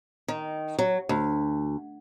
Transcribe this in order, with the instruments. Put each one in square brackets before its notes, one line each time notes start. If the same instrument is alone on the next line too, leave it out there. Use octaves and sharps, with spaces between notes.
[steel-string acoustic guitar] D#3
F#3
D2